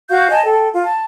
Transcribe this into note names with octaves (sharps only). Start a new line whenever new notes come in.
F#4 F5 C#6 G6
D#5 G#5 A5
A4 G5
F4
A5